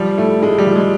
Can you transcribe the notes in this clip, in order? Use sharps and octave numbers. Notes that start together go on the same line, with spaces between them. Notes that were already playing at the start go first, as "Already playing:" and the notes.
Already playing: F3 G3
A2 A3
A2 G#3
G3
F3
G#3